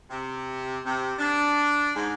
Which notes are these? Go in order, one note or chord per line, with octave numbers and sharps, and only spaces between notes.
C3
C3
D4
G#2